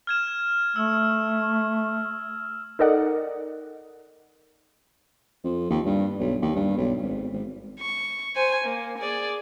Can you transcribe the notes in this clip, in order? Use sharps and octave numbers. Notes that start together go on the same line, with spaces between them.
F6 G#6 E7
A3 E6
D#4 A4 A#4 D5 D#5 F#5
F2
D#2
G2
B1
D#2
G2
B1
G#1
G#1
C#6
C5 G#5
A#3
G#4 D5